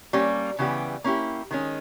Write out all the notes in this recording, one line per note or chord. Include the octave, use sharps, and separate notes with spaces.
G3 A#3 C#4
C#3 E3 G3 B3 G4
A#3 C#4 E4 G4
D#3 G#3 C#4